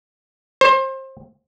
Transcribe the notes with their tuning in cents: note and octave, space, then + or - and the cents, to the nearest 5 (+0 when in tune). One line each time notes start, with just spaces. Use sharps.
C5 +25